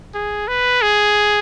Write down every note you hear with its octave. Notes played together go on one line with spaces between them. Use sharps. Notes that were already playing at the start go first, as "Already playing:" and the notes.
G#4
B4
G#4